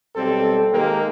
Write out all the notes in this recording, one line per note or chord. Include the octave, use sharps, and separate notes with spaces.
B1 G3 C4 A4
D#3 G#3 A#3 G4 A#4